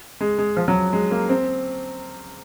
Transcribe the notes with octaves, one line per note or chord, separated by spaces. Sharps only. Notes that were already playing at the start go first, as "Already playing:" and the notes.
G#3
G#3
F3
F#3
G#3
A#3
C4